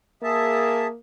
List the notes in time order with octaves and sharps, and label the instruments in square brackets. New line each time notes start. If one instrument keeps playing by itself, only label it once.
[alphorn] A#3 [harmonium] G#4 E5 A5